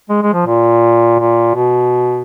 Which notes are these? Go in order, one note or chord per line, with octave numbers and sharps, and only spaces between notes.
G#3
G#3
F3
A#2
A#2
B2